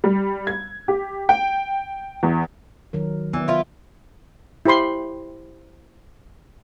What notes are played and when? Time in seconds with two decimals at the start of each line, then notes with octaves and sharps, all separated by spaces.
0.04 G3
0.47 G#6
0.88 G4
1.29 G5
2.23 E2
2.93 D#3 F#3 A#4
3.33 E3 B3 D5
3.48 E4 F4
4.66 E4 G4 C5 B5 C6